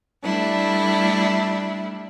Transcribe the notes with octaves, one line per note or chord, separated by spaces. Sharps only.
G3 A3 D4 E4